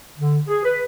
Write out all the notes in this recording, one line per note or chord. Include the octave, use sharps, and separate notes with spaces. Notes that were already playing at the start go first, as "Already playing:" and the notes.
D3
G#4
B4